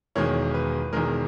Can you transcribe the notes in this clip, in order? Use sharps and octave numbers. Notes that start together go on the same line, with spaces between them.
E1 E2 D#3 G#3 C#5
B4
E1 E2 D#3 G#3 A#4